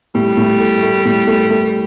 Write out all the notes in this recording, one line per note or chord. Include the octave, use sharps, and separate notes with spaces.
A2 G3
A2
A3
A3
A2
A3
A3